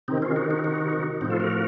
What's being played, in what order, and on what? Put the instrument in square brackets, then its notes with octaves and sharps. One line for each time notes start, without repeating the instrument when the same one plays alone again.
[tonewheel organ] C3 D#3 C4 D#4
C#4 F4
D#4 F#4
D#4 F#4
D#4 F#4
A2 C4 D#4
F3
F4 A4
F#4 A#4